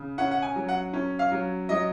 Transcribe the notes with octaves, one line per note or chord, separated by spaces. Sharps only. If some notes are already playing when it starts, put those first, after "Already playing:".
Already playing: C#3
C#4 F#5
F#5
G#5
F#3
F#5
C#4
F5
F#3
F#3 D#5